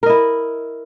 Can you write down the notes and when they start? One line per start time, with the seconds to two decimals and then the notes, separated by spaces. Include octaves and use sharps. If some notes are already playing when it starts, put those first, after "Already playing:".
0.03 A#4
0.06 D#5
0.09 E4